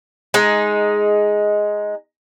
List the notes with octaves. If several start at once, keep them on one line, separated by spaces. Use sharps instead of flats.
G#3 D#4